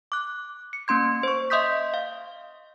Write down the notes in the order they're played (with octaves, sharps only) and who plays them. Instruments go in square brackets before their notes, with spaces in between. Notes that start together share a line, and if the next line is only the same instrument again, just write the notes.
[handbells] D6 F#6
C#7
A#3 C#4 C6 G#6
C5 C#6
D#5 E5 C6 D#6 G6 B6
F5